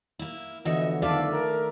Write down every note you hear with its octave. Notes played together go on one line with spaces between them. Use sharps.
A#3 E4
D3 E3 F3 B3 F#4 D#5 E5
D#3 A3 A4 B4 D5 E5 F5
A#4